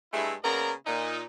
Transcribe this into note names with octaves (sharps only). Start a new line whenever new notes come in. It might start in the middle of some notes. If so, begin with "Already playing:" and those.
G2 G#3 A3 E4
C#3 A#3 B3 A#4 D5 A#5
A#2 D#4